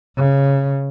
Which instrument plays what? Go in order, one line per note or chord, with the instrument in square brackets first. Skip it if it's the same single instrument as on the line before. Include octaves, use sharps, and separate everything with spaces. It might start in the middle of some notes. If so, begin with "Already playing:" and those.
[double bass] C#3